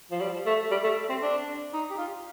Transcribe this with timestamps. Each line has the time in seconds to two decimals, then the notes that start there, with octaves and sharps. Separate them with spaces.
0.11 F3
0.21 G3
0.46 A3
0.71 G3
0.84 A3
1.10 C4
1.22 D4
1.73 D#4
1.90 G4
1.98 F4